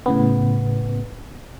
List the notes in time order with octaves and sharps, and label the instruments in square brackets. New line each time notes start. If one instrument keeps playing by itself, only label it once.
[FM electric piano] A2 C#3 B3